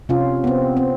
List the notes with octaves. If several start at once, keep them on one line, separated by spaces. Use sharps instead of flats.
C3 C#4 F4
B3 C4
C4